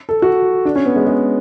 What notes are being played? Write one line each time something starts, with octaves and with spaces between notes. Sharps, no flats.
A4
F#4
D4
C#4
B3
G#3
G#3